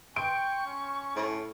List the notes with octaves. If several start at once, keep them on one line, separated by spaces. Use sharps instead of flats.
G5 C6 C#6 D7
C#4
A2